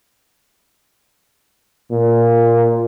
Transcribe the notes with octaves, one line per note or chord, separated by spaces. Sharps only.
A#2